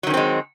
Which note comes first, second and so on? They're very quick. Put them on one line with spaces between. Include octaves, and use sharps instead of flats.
F#3 D#3 C#4 C4 G#3